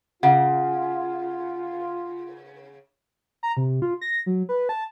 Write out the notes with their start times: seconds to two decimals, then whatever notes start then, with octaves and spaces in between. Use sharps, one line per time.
0.23 C#3 F4 F#5
3.43 A#5
3.57 C3
3.82 F4
4.01 A#6
4.26 F#3
4.49 B4
4.69 A5